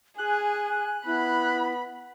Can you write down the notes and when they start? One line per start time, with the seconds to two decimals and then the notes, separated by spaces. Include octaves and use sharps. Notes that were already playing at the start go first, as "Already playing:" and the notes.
0.18 G#4 G#5 F#6
1.06 B3 E4 B5